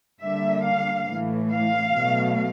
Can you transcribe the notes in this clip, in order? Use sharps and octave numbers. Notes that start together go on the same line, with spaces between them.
D3 G3 A#3 D4 E5
F5
A2 E3 A3
F5
B2 F#3 A3